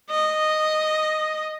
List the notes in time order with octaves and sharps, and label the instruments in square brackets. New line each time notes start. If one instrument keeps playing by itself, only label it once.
[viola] D#5